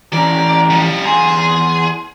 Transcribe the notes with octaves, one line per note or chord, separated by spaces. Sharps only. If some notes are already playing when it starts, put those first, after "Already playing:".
E3 C#4 D5 A#5
F3 G3
E2 G#4 G#5 A#5 C6